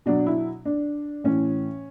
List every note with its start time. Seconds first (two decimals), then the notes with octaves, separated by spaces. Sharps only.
0.06 B2 F#3 D4
0.26 E4
0.65 D4
1.24 A2 E3 C#4